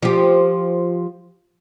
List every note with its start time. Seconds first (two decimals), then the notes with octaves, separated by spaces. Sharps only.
0.02 F3 G4